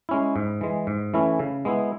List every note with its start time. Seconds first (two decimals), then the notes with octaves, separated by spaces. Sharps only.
0.09 G#3 C#4 E4
0.36 G#2
0.61 E3 G#3
0.87 G#2
1.14 E3 A3 C#4 E4
1.39 C#3
1.65 G#3 B3 E4